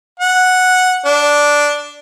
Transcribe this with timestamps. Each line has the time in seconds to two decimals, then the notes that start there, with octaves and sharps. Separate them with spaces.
0.20 F#5
1.06 D4